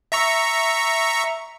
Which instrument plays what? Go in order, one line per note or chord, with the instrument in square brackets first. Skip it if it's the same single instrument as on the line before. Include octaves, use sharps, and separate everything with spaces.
[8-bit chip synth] E5 A#5 C#6